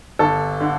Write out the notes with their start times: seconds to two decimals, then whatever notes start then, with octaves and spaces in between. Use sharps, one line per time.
0.19 G1 A4
0.60 D3